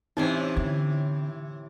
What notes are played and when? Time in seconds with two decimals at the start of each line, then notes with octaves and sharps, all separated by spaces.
0.17 A2 C3 E3 C4 C#4 D#4 C5 D#5
0.57 D3